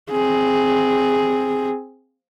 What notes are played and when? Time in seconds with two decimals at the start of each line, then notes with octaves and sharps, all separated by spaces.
0.10 C4 G#4